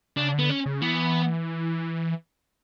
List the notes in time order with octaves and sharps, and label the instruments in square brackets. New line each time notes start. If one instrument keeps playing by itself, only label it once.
[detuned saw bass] C#3 [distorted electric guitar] D4
[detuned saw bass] D3 [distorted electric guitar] B3
[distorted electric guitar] C#4
[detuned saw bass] C#3
[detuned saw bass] E3 [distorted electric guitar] B3